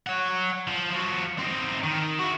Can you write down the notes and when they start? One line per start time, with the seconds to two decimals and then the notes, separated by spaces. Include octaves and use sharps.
0.07 C#5 F#5
0.68 F3
0.91 F3 F#4
1.39 C4 D#4
1.84 D#3
2.19 E4 F#4